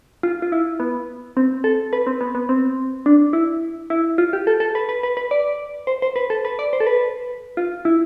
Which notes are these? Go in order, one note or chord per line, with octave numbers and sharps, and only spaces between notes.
F4
F4
E4
B3
C4
A4
B4
C4
B3
B3
C4
D4
E4
E4
F4
G4
A4
A4
B4
B4
B4
B4
D5
C5
C5
B4
A4
B4
D5
C5
A4
B4
F4
E4